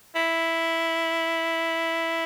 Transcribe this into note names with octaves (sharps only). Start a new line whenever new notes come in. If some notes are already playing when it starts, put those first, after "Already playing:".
E4